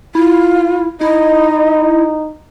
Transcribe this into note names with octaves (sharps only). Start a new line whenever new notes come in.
E4 F4
D#4 E4 D#5